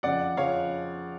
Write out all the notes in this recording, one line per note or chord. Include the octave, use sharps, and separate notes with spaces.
F2 C#3 F3 D5 F#5
F2 C#3 F3 C#5 F5